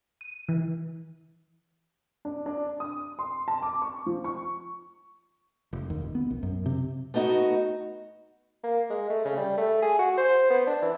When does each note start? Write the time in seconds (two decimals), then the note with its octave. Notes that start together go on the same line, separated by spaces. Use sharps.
0.21 D#7
0.49 E3
2.25 D4
2.46 D4
2.80 D#6
3.19 C6
3.48 A5
3.62 D6
3.82 C#6
4.06 F3
4.24 C#6
5.73 F1
5.90 D#2
6.02 D#1
6.15 B3
6.30 A#1
6.43 F#2
6.66 C3
7.14 A3 B3 D#4 F4 F#4
8.64 A#3
8.90 G#3
9.10 A3
9.25 C#3
9.37 G3
9.57 A3
9.82 G#4
9.99 F#4
10.17 C5
10.50 B3
10.67 D4
10.82 E3